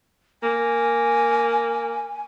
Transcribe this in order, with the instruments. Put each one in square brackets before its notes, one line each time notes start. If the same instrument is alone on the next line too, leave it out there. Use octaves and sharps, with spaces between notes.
[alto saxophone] A#3 [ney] G#5